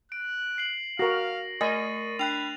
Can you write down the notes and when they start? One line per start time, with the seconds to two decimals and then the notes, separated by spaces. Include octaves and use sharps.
0.12 F#6 D7
0.58 C7 F#7
0.99 F#4 A#4 F5 A#6
1.61 A3 A#4 D#5 G#5 C#6 A6 D#7
2.19 D4 G5 B5 F#6 F7